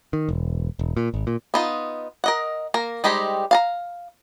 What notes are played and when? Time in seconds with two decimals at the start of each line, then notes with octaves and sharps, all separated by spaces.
0.13 D#3
0.29 E1
0.79 E1
0.97 A#2
1.14 G#1
1.27 A#2
1.54 B3 D#4 F4
2.24 A#4 D#5 F#5
2.74 A#3 A#4
3.04 G3 G#3 D#4 G4 C5
3.51 F5 A5 A#5